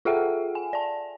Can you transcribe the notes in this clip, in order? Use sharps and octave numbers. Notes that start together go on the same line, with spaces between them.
F4 G#4 A4 E5 F#5 G5
G#5
D5 A5